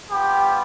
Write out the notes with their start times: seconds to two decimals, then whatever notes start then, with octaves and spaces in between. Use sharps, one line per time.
0.11 G3 B3 D4 F4 G4